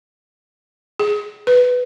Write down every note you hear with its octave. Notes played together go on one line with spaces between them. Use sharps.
G#4
B4